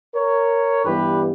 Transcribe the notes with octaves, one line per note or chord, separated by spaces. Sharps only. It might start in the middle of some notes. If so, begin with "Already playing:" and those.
A#4 C#5
G2 E3 G3 B3 G4 B4